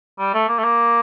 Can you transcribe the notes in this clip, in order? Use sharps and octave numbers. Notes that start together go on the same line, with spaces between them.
G3
A3
A#3
A3
A#3